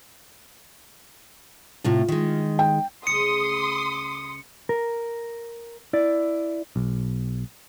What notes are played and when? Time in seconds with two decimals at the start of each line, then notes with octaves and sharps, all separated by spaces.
1.84 A2 C3 A3 F4
2.09 D#3 G#3
2.59 G5
3.07 C#2 G3 A3 C6 D#6 C#7
4.69 A#4
5.93 E4 D5
6.76 B1